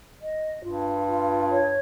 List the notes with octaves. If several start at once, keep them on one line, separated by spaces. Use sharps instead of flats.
D#5
G2 F4
F4
C#5